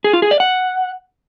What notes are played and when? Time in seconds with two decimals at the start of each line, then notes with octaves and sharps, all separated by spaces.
0.04 G#4
0.13 F4
0.22 G#4
0.31 D5
0.40 F#5